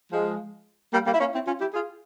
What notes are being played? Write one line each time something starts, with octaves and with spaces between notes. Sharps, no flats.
F3 G#3
G3 A#3
G3 A#3
E4
A#3 C#4
C4 E4
C#4 F4
E4 G4
F4 G#4